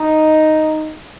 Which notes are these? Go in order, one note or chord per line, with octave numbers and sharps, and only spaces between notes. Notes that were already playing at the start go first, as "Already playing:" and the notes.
Already playing: D#4